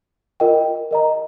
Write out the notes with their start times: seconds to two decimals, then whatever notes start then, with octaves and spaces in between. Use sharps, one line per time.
0.40 F4 A#4 D#5 G5
0.91 A#4 D#5 A#5